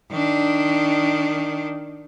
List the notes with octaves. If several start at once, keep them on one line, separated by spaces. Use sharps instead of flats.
D#3 D4